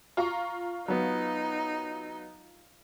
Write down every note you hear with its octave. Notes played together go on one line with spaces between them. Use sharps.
F4 A#5 C#6
F#3 B3 D#4